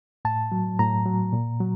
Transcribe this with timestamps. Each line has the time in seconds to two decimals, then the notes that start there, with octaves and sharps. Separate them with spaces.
0.25 A2 A5
0.52 F#3
0.79 A2 A#5
1.06 F#3
1.33 A#2
1.60 F#3